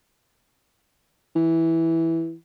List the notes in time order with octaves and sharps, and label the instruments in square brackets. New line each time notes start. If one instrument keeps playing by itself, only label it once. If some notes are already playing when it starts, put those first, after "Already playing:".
[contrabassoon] E3